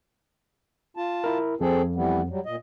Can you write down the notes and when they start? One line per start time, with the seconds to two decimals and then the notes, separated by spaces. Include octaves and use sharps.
0.97 F4 A5
1.24 E4 A#4
1.61 F2 C4 G#4 A4
1.95 E3 G3 B3
2.29 F#3 G3
2.46 A#2 D#5